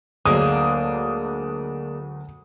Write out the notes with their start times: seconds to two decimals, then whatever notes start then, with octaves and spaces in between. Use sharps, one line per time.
0.26 D2 F#3 G#3 A#3 D4 D#6